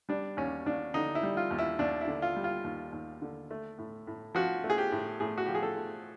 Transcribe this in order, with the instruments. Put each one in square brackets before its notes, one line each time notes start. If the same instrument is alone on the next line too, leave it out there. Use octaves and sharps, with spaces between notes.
[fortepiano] G3 D4
D#2 C#4
D#2 D4
D3 D#4
E4
G3
F4
D#2
E4
D#2 D4
E4
D3
F4
G3
F4
D#2
D#2
D3
A3
A2
A2
F3 F#4
A3
G#4
G4
A2
A2 G#4
F#4
F3 G4
G#4
A4
A3